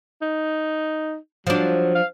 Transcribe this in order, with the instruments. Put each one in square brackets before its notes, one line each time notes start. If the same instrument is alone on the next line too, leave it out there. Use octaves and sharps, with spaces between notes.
[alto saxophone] D#4
[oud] F3 D4 [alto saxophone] F#3
[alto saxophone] F5